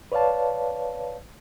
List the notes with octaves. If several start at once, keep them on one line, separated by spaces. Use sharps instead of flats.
B4 C#5 D5 F5 A5